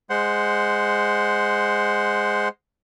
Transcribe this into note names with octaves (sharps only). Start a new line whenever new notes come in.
G#3 C5 F#5